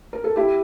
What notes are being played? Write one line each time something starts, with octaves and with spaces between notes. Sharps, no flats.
A#4
A4
E4 G4